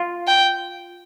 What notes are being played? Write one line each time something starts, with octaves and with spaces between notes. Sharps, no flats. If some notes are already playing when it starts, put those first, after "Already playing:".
Already playing: F4
G5